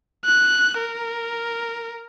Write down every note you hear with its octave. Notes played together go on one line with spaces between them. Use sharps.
F#6
A#4